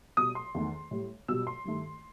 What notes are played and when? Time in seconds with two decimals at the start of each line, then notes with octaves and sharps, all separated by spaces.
0.17 B2 G3 D#6
0.35 C6
0.55 E2 D#3 A3
0.91 A2 G3
1.28 B2 G3 E6
1.47 C6
1.65 G2 D#3 A3